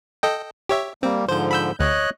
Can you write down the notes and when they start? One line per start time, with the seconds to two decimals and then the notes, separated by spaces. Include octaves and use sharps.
0.23 A4 D#5 G5
0.69 G4 C#5 E5
1.03 G3 A#3 C4
1.28 G#2 D3 F3 C5 G6
1.51 B5 E6 G6
1.80 D2 C#5 D#5 F#6